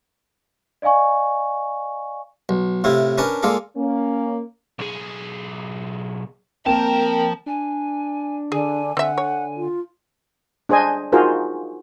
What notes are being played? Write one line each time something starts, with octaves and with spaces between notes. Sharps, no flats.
D5 D#5 F5 G#5 C#6
B1
A2 C3 E4 F4
C#4 D4 A#4 B4 A5
G#3 A#3 F4 A4 D5
A#3 C#4
B1 G#4
F3 A#3 C4 A#4 G5 A5 E7
D4 G#5
D3 G#4 G#5
D3 C4 E5 F#5 G#5
C#5
F4
D4 G#4 C5 D#5 G#5
D#4 F4 F#4 G#4 A#4 C5